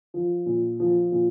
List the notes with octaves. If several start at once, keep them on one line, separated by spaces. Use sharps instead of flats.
F3
A#2
F3
A#2